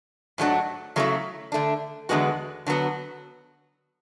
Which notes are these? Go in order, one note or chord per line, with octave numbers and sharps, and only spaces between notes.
G#2 F#3 A3 D4 F#4
C#3 F#3 A3 E4
D3 A3 D4
E2 D3 G#3 B3 F#4
D3 F#3 B3 F#4